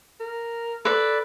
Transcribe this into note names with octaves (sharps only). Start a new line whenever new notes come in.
A#4
A4 B4 D5